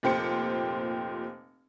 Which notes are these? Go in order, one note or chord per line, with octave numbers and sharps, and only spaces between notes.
F1 A#2 G4 C5 C#7